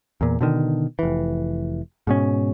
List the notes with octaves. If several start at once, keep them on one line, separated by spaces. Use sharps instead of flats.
E2 A#2
B2 D3 D#3
F1 E3
G#2 B2 C#4